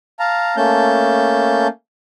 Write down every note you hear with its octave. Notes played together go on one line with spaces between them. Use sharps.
F5 A5 A#5
A3 A#3 C#4 A5 G6